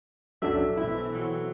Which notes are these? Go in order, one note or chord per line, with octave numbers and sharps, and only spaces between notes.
B1 F2 A2 F#3 C#4 D4 A4 E5
B2 E3 C4 E4
F#3